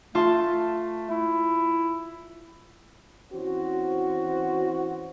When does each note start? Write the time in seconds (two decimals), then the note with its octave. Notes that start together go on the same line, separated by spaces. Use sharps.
0.15 A3 F4 A5 C6
1.10 E4
3.32 E3 C4 C#4 F#4